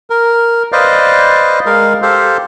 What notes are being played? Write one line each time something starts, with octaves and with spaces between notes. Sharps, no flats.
A#4
B4 C5 D5 D#5 F5
G#3 A#4 F5
G4 A4 C5 F5